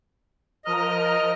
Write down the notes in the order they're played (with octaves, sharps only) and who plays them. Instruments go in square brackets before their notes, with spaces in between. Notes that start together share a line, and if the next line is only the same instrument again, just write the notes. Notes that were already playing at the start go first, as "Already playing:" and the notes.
[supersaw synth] F3 A#4 F6 [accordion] D#5